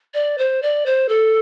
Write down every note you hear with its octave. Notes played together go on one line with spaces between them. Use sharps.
D5
C5
D5
C5
A4